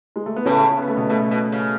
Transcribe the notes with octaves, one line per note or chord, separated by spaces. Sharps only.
G#3
A3
B3
A2 C#3 C#4
B3
A3
B2 B3
B2 A3
B2
C#3